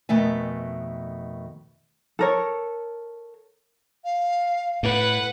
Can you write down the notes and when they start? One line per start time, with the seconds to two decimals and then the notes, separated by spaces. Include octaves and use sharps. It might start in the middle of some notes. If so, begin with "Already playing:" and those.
0.09 F2 B2 D#3 A3 E5 G#5
2.19 A4 A#4 C#5
4.04 F5
4.83 A2 B4 F#5